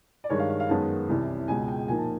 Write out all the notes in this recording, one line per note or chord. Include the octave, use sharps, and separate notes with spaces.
D5
G2 D#3 G#3 C#5
F5
F5
F5
F#2 D#3 G#3 B3 D#4 A5
C2 C3 E3
C#2 B2 G#3 G#5
G5
A#2 F3 A#3 D#4 G#5
A5